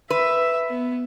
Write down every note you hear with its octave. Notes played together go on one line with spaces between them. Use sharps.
B4 E5
B3